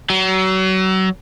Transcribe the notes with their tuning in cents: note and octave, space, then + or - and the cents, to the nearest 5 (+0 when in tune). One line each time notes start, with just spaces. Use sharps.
F#3 +30